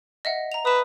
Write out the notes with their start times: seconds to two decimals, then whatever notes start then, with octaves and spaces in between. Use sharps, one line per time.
0.25 D#5 E5 F#5
0.52 A#5 F7
0.65 B4 D#6 E7